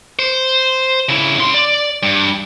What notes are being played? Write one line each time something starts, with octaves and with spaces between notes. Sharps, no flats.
C5
C#3 E4
C#3 C6
D5
G2